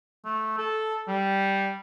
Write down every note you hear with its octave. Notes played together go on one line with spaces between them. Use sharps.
A3
A4
G3